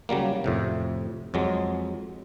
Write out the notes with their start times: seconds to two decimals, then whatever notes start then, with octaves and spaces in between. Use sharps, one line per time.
0.09 C#3 F#3 G3 A#3
0.44 F2 A2 C3
1.34 F2 F#3 G#3